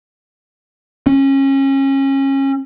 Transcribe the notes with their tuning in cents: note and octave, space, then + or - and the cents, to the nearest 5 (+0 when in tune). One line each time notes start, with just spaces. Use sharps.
C#4 -25